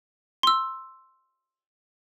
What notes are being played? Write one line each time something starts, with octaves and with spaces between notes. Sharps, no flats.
C6 E6